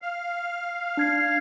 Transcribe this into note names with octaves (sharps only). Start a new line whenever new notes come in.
F5
D4 G#6 C7